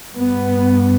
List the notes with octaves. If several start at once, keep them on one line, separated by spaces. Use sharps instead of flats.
G2 B3